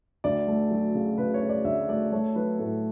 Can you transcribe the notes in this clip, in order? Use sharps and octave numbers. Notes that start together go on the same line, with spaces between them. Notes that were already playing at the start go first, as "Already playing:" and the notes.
D2 D5
A3
F#3
C#3
C#3 B4
C#5
C#3
D5
D2 E5
A3 D5
A3 C#5
F#3 B4
A2 A4